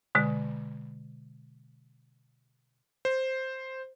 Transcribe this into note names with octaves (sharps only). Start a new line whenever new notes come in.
B2 D3 G#3
C5